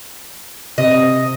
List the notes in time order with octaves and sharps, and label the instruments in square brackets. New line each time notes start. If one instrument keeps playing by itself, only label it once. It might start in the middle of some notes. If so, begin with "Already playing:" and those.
[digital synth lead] C3 [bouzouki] D#5